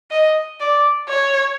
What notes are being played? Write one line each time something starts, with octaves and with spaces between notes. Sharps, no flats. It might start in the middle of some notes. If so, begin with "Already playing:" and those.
D#5
D5
C#5